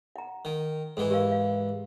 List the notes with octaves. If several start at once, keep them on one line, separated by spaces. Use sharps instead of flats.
F#5 A#5
D#3
G#2 E3 A4
G4 A#4 F5
F5